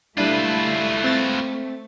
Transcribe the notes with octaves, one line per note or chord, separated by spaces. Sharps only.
G3 A3 D4 E4 F4 B4
C4 A6